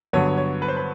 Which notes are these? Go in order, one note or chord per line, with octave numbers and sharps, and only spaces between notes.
G2 D3 F#3 B3 C#5
C#5
B4
C5
B4